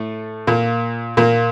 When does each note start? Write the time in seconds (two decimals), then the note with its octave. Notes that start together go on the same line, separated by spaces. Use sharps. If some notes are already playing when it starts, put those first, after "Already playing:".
Already playing: A2 A3
0.47 A#2 A#3
1.17 A#2 A#3